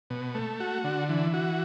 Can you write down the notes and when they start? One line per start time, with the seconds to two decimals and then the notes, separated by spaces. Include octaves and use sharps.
0.10 B2
0.35 A3
0.60 F#4
0.84 D3
1.09 E3
1.34 F#4